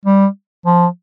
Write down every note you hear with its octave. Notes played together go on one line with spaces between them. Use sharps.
G3
F3